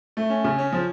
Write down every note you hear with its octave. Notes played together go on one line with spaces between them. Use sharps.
A3
C#4
C#3
C#4
F3